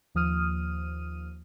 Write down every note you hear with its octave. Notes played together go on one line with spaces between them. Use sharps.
D#2 F3 D#6 F6 D#7